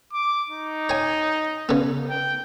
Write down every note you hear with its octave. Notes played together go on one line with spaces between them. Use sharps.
D6
D#4
C#5 G#5
C#3 B3
G5